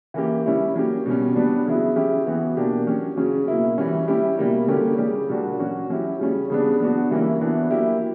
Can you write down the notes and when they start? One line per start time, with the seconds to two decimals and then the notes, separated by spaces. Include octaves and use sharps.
0.14 E3 A#3 C#4 G4
0.45 G3 C#4 E4 G4
0.75 F#3 A#3 C#4 G4
1.06 B2 G3 C#4
1.36 G3 B3 D4
1.66 C#3 F#3 B3 E4
1.96 C#3 F#3 C#4 E4 G4
2.26 E3 B3 F#4
2.57 B2 A#3 D4 G4
2.87 F#3 C#4 G4
3.17 C#3 F#3 C#4
3.48 B2 A#3 E4
3.78 E3 G3 C#4
4.08 G3 C#4 E4 G4
4.38 B2 G3 A#3 E4
4.68 D3 G3 A#3 C#4 G4
4.98 C#3 G3 C#4 G4
5.29 A#2 G3 A#3 D4 F#4
5.60 F#3 C#4 F#4
5.90 F#3 C#4 E4 G4
6.20 C#3 G3 C#4
6.50 C#3 G3 B3 D4
6.80 F#3 B3 D4 F#4
7.11 E3 G3 A#3 C#4 E4
7.40 E3 B3 D4 F#4
7.71 F#3 A#3 E4 G4